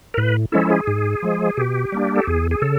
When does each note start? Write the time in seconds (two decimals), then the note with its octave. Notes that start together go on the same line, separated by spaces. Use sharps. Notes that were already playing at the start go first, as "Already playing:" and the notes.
0.14 A#4
0.17 A2 B4
0.52 F3 G#3 C#4 E4 A4
0.70 G#4
0.87 G#2
1.23 F3 G#3
1.57 B2 G4
1.92 G3 A#3 D4
2.16 A4
2.27 E2 G#4
2.51 G#4
2.62 C#3 A4